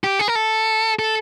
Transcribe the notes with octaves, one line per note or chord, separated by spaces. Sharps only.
G4
G#4
A#4
A4
A4